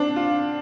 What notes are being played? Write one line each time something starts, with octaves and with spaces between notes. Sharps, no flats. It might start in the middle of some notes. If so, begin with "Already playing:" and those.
Already playing: C4 D4
F4